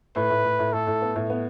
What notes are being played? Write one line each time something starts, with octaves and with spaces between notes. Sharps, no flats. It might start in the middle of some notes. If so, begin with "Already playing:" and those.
A2 B4
A2
A2
A2
A2 A4
A2
B3
A2
B3